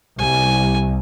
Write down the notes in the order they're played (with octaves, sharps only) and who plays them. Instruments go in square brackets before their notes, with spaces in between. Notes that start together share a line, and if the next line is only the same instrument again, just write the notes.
[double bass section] C2 [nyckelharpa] G#5